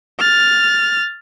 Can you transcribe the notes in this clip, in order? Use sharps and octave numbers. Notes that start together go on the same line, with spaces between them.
F6 A6